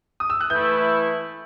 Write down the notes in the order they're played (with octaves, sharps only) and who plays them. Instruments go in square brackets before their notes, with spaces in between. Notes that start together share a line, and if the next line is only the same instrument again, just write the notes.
[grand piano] D#6
E6
F#6
[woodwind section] E3 A3 E4 [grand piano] G6